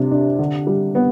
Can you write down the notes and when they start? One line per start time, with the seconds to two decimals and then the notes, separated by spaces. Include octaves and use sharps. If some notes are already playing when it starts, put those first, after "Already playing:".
Already playing: C3 G3 D4
0.11 D4
0.39 D3
0.67 G3
0.95 B3